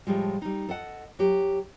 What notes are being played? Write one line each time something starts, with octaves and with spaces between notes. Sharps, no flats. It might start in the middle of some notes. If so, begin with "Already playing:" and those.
A2 F3 G3 G#3
G3 D#4
A4 D#5 F#5
F#3 G4